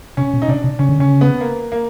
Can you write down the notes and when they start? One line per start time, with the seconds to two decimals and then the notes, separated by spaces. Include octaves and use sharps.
0.17 C3 C#4
0.33 B2
0.42 D#4
0.48 C3 D4
0.64 C3
0.79 C#3 C#4
0.89 D3
0.99 C#3 C#4
1.21 B3
1.41 A#3
1.72 A#3